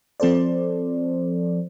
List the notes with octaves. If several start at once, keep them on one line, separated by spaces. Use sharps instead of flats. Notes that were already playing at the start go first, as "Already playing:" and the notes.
F3 C4 A4 C5 D5